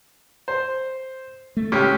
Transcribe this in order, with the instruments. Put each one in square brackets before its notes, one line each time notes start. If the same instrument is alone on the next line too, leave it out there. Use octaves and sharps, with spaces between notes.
[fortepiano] C5
[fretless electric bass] A3
[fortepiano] C#2 C#4 G4